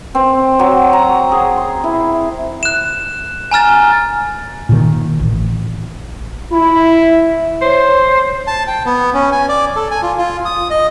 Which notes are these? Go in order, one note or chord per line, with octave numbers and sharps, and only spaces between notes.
C4
F#3
A#5
G#4
C6
E4
F#6 E7
G#5 A#5 F6 A6
A#2 D#3
A1
E4 B5
E5
C5 C#5
A5
G5
B3
C#4
G#5
D5
A4
G#5
F4
F4
D#6
D#5